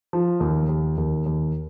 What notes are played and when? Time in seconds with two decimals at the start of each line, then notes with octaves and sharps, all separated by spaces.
0.13 F3
0.40 D#2
0.69 D#2
0.98 D#2
1.26 D#2